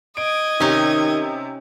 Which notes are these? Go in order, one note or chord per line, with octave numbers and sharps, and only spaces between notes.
D#5 G#6 D7
C3 D#3 C#4 D#4